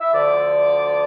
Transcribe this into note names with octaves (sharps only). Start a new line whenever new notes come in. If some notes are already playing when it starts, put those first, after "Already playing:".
E5
D2 D3 F3 D5